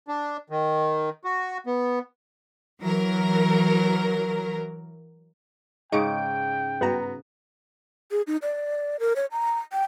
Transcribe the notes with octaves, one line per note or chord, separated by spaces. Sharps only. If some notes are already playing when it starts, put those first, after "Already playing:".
D4
D#3
F#4
B3
E3 F#3 A#4
G#2 C#3 D#5 G5 C#6 D7
G2 B3 F#4 A#5
G#4
D#4
D5
A#4
C#5
A#5
G5